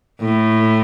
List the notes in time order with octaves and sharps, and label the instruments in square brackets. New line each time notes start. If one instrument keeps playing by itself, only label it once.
[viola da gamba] A2